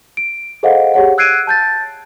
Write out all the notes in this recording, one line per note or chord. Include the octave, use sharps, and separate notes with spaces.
D7
G#4 A4 C5 D#5 F5 F#5
G4 G#4 C#5 F#5
E6 F#6 G#6 C7 D7 D#7
A5 G6 A6